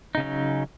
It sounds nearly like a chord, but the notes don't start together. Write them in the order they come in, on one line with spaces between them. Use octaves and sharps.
D#4 C#3 C#4 F#3